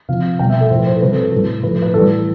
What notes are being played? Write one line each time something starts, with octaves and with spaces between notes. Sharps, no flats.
C3 F3 F5
B2 G3 G5
E5
A4
A2 F3 C5
B4
C5
A4
C3 G3 B4
A4
A4
A2 G3 A4
A2 F3 B4
B4
A2 E3 G3 A4